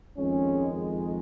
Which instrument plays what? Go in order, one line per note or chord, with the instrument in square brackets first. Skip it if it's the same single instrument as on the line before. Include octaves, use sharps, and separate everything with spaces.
[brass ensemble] F2 D#3 G#3 C#4